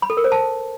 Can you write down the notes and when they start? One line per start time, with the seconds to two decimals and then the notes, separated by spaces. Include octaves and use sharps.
0.02 B5
0.10 A4
0.17 A#4
0.24 C5
0.32 A5